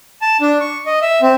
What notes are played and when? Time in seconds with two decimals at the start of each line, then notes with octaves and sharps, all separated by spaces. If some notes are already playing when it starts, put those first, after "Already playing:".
0.22 A5
0.41 D4
0.60 C#6
0.86 D#5
1.02 E5
1.22 C4